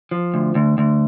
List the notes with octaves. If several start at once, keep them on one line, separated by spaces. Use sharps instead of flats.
F3
D2
D2
D2